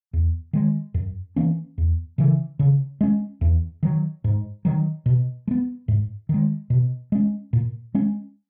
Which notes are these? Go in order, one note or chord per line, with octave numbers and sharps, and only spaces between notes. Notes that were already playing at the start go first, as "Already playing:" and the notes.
E2
D#3 G#3
F#2
E3 A#3 C#4
E2
C#3 E3
C#3
G#3 C#4
E2
D#3 F#3
G#2
D#3 F#3
B2
G#3
B3
G#2
D#3 G#3
B2
G#3 C#4
A#2
G#3 C#4